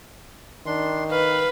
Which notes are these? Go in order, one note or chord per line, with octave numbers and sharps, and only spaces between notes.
D#3 D4 C6
B4 F5